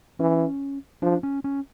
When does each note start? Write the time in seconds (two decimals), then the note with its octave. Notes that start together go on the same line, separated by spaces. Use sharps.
0.19 E3 C#4
1.02 F3 D4
1.23 C#4
1.44 C#4